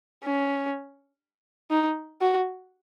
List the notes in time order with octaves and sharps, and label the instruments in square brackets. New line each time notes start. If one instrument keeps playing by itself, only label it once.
[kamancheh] C#4
D#4
F#4